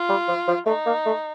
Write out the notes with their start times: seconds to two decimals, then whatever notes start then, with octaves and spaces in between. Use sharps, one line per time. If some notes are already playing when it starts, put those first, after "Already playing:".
Already playing: F4
0.09 G3
0.28 F3
0.48 F3
0.66 A3 D#4
0.86 A#3
1.06 A3